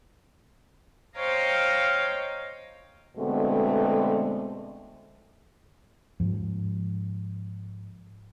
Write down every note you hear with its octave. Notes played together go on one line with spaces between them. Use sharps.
C5 C#5 D#5 F5 G5 A#5
B2 D3 G#3 A3 B3 C4
G#2 F3